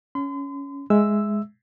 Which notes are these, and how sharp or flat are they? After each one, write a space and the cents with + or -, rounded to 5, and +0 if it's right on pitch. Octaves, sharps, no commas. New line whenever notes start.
C#4 +10 C6 -40
G#3 +0 E5 +0 E6 +0